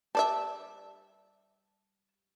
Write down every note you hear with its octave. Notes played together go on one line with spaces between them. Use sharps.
G3 D5 E5 A5